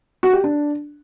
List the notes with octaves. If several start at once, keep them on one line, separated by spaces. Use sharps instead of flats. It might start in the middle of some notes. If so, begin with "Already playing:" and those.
F#4
G4
D4